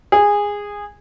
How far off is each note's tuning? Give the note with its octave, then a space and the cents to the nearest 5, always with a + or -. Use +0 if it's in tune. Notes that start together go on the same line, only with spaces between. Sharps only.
G#4 -15